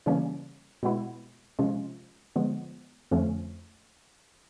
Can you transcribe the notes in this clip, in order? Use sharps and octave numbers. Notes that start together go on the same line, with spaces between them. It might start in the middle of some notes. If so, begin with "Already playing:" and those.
C#3 E3 G3 A#3 C#4
B2 G#3 B3 E4
C3 F3 G#3 C#4 F4
D3 F3 G#3 B3
F2 D3 F3 A3 C#4